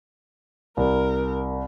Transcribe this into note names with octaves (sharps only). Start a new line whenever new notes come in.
C2 A#4